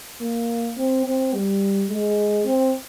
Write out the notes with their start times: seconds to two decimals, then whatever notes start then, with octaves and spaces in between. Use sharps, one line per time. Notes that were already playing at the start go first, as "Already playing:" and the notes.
0.21 A#3
0.77 C4
1.06 C4
1.34 G3
1.90 G#3
2.45 C4